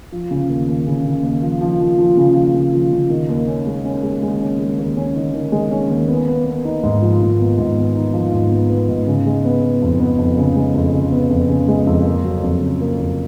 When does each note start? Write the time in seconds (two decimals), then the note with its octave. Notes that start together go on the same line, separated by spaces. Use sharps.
0.12 F3
0.31 C#3
0.49 D#2
0.68 D#2
0.87 C#3
1.05 C#3
1.23 D#2
1.42 F3
1.61 F3
1.80 F3
1.98 F3
2.17 C#3
2.35 F3
2.54 C#3
2.73 F3
2.92 C#3
3.10 D#3
3.29 D#2
3.47 C#4
3.67 G#3
3.85 C#4
4.03 G#3
4.23 G#3
4.40 C#4
4.59 G#3
4.79 D#2
4.97 C#4
5.16 D#3
5.33 D#3
5.52 G#3
5.71 C#4
5.90 D#2
6.08 B3
6.27 B3
6.46 B3
6.65 D#4
6.83 G#2
7.01 F3
7.21 G#2
7.39 B3
7.58 G#2
7.77 B3
7.95 D#4
8.13 F3
8.32 G#2
8.51 B3
8.70 B3
8.89 G#2
9.07 C#3
9.26 G#3
9.45 B3
9.64 B3
9.82 F2
10.00 B3
10.18 F2
10.38 C#3
10.56 G#3
10.74 F2
10.93 C#3
11.12 B3
11.30 F2
11.49 C#3
11.68 G#3
11.87 F2
12.06 A#3
12.24 F#3
12.43 F2
12.61 C#3
12.81 A#3
12.99 F2